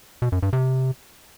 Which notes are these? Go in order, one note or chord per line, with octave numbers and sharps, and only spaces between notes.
B2
F#2
G2
C3